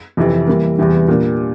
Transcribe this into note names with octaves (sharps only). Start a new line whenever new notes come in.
F2 C3 E3
E3 G3 A#3
E2 C3 E3 G3
A#2 G3 A#3 D4